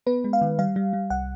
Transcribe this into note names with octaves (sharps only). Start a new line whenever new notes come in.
B3 B4
G#3
F5
D#3
G3 F5
G3
G3
C2 F#5